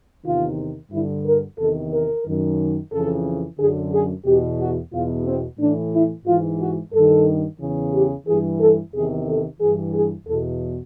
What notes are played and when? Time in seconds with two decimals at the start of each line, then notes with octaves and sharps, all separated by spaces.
0.25 E2 C3 D#3 F4
0.92 G2 D3 E4
1.26 A#4
1.59 E2 C3 D#3 A4
1.92 A#4
2.26 F#2 D#3
2.92 F2 C#3 E3 A4
3.59 F#2 D3 G#4
3.92 G#4
4.25 E2 B2 G4
4.59 F#4
4.93 E2 B2 F4
5.26 C4
5.59 A2 E3 D4
5.93 E4
6.26 G#2 E3 F4
6.60 F#4
6.93 G2 D#3 A4
7.60 E2 C#3 E3
7.93 G4
8.27 G2 E3 G#4
8.60 A4
8.93 E2 C3 D#3 G#4
9.27 A4
9.60 G2 E3 G#4
9.94 G#4
10.27 E2 B2 A4